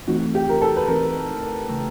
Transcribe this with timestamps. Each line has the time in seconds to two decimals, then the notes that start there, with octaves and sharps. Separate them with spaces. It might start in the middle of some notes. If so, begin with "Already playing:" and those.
0.07 E3 A3 C4 D#4 F#4
0.35 G4
0.49 A#4
0.62 A4
0.76 B4
0.88 E3 A3 C4 D#4 A#4
1.68 C#3 E3 A3